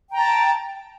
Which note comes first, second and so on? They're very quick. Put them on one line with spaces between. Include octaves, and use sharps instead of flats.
G5 A#5 A5